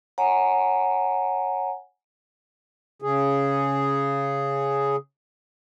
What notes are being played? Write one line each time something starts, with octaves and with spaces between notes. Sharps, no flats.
C#5 F#5 G#5 A#5
C#3 G#4